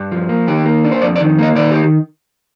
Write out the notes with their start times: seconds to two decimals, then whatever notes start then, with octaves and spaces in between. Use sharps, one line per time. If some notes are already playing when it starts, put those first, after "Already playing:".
Already playing: G2
0.11 F3
0.29 A#3
0.47 D#3 G4
0.66 A#3
0.84 D4
0.92 C5
1.02 F2 D5
1.16 D5
1.20 D#3
1.39 A#3 D#5
1.55 D#3 D5
1.71 G4